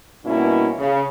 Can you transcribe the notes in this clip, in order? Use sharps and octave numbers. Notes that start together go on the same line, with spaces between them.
G2 B2 A#3 C#4 E4
C#3